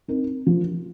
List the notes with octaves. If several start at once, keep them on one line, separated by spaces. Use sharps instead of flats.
C4 D#4 A#4
F3